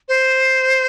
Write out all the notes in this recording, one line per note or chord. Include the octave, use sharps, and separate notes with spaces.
C5